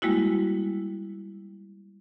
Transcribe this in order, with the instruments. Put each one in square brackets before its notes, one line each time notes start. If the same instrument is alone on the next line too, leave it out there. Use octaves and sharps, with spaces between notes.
[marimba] G3 G#3 A#3 E4 F#4